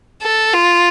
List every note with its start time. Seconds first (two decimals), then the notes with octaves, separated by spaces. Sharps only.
0.22 A4
0.53 F4